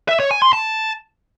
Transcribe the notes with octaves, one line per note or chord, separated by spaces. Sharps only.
E5
C#5
G#5
C6
A5